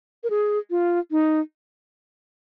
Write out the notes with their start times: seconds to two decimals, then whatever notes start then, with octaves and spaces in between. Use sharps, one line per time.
0.24 A#4
0.30 G#4
0.70 F4
1.11 D#4